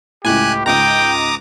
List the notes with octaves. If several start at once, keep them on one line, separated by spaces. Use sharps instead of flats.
C#2 A2 G4 G#5 F#6 G#6
C#2 G#2 G5 A#5 D6 D#6